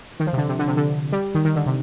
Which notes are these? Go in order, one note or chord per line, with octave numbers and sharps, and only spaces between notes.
D#3
F3
C3
D3
C3
D3
C3
D3
G3
D#3
D#3
D3
C3